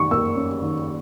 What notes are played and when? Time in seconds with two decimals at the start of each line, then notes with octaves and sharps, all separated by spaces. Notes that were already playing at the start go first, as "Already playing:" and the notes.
Already playing: D#3 C#6
0.11 A#3 E6
0.36 C#4
0.62 D#3